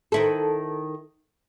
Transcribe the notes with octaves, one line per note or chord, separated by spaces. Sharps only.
D#3 E4 A4